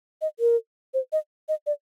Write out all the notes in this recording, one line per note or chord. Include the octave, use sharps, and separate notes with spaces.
D#5
A#4
C5
D#5
D#5
D5